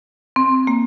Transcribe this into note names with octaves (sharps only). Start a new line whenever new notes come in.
C4
A#3